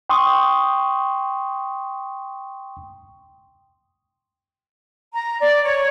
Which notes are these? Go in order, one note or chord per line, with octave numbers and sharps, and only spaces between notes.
G5 C6 C#6 D#6
A#5
D5
C#5